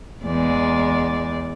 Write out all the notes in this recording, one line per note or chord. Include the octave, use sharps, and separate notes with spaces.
E2 G#3 D5